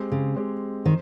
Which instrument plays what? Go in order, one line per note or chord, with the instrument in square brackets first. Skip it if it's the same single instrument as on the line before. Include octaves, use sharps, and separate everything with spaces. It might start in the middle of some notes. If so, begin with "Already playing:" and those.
Already playing: [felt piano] G#3 C4 G4
[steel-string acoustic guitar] C#3
[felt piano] G#3 C4 G4
[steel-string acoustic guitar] D#3 [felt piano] C5